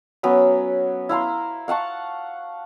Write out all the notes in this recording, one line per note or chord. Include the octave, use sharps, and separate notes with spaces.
F#3 B3 C#4 B5
E4 F5 A#5 C6
F5 F#5 A5 C#6